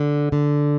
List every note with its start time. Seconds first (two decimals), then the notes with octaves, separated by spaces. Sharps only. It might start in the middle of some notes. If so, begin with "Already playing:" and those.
Already playing: D3
0.32 D3